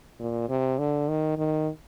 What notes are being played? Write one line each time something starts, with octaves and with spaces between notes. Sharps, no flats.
A#2
C3
D3
D#3
D#3